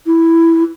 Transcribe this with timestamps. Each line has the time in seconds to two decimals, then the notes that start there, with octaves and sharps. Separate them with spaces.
0.06 E4